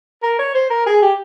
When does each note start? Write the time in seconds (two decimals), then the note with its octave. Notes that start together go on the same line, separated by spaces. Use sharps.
0.23 A#4
0.39 C#5
0.54 C5
0.70 A#4
0.86 G#4
1.02 G4